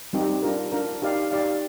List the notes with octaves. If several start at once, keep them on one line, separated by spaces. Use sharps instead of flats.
G3 C4 D#4 G4
D4 F4 A#4
D4 F4 A#4
D#4 G4 D5 F5
D#4 G4 D5 F5